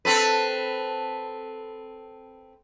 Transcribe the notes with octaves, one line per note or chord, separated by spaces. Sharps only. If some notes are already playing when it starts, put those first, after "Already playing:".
C4 A4 B4